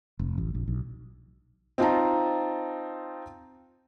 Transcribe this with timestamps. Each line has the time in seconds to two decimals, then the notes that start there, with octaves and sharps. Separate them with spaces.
0.19 F1
0.38 A1
0.55 A#1
0.68 B1
1.78 C4 D#4 F4 D#5 A5 A#5